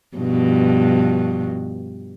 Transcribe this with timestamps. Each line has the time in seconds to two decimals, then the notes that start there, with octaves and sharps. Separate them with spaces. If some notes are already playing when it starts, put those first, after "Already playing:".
0.17 G2 B2 F3